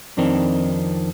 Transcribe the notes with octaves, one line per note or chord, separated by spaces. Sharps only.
F2 D#3 C4 D4 D#4